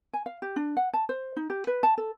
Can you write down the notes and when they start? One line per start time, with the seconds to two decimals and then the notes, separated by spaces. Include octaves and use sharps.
0.13 G#5
0.26 F5
0.42 G4
0.56 D4
0.77 F#5
0.93 A5
1.09 C5
1.36 D#4
1.50 G4
1.67 B4
1.83 A5
1.98 A4